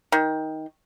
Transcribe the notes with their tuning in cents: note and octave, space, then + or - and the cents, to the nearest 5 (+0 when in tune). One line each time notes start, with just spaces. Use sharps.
D#3 +15